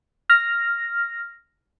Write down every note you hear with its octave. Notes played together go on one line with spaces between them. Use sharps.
F6 A#6